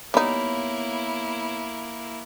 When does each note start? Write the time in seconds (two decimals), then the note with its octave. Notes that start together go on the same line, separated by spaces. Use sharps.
0.14 G3 A#3 B3 D#4 E4 C#5 B5